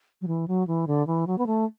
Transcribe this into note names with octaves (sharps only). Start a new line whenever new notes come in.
F#3
E3
F#3
E3
D3
E3
F#3
B3
A3